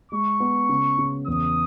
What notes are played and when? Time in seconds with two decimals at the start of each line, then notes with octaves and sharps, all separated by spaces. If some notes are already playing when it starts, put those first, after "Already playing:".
0.11 G#3 C#6
0.40 B3
0.69 C#3
0.99 C#3
1.27 E2 D#6